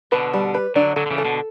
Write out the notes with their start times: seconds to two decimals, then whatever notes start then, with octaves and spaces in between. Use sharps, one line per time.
0.12 B2 D3 B4
0.34 G3
0.54 B4
0.75 D3 F#3 D4
0.96 D3 F#3 A4
1.06 D3
1.11 C#3 E3
1.18 A4
1.25 B2 D3